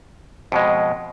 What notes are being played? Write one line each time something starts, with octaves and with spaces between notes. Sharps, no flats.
F2 B2 G#3 D#5